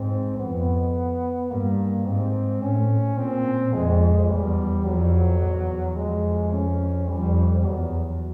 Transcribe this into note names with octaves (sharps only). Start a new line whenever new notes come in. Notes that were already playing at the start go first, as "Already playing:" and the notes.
Already playing: G#2 C4
F2 B3
G2 A#3
G#2 C4
A2 C#4
A#2 C4
F2 G#3
E2 G3
F2 F#3
E2
F2 G#3
C#4
F2 G3
E2 F#3